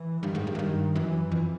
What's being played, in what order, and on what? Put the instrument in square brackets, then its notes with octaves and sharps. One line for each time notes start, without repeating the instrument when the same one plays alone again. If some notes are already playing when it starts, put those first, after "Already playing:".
Already playing: [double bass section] E3
[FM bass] G2 [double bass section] D#3
[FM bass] G#2
G2
F#2
G2
[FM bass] F#2 [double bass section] E3
[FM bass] F2